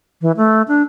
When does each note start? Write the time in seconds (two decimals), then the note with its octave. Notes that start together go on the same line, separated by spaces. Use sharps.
0.21 E3
0.37 A3
0.68 D4